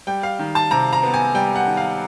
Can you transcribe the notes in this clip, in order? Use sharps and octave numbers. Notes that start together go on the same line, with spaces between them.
G3 G5
F5
D#3
A5
C3 A#5
A#5
B3
G#5
G3 G5
F#5
D#3
F5